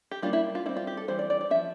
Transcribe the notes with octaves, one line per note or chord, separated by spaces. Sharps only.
G4
G3 A#3 D4 F4
E4
F4
G3 C4 E4
F4
G4
A4
E3 G3 C4 C5
D5
D5
D5
F3 C4 E5